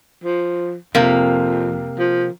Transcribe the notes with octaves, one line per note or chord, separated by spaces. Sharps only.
F3
F2 C3 A#3
F3